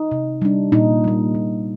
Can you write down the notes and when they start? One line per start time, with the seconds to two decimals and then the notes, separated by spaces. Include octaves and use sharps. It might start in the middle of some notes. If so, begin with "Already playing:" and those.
Already playing: D#4
0.12 C3
0.42 G3 D4
0.72 A#2 D#4
1.04 G3 A#3
1.35 A#2